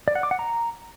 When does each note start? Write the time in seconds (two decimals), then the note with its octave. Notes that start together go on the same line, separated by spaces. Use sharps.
0.08 D5
0.15 F#5
0.23 D6
0.31 F#5
0.39 A#5